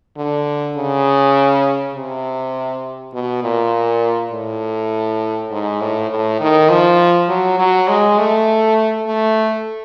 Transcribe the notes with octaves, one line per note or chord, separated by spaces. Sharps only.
D3
C#3
C3
B2
A#2
A2
G#2
A2
A2
D#3
F3
F#3
F#3
G#3
A3
A3